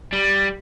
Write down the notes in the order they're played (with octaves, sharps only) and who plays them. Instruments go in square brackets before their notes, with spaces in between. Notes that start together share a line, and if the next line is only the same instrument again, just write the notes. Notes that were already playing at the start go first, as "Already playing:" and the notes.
[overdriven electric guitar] G3